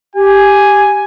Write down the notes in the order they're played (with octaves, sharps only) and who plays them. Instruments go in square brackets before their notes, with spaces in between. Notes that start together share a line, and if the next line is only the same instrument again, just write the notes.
[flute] G4 [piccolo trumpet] G#5